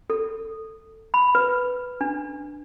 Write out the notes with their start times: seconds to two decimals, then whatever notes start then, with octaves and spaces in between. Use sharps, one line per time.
0.10 A4
1.14 B5
1.35 B4
2.01 D4